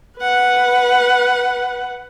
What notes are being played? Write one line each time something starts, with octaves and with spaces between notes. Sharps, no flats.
B4 F#5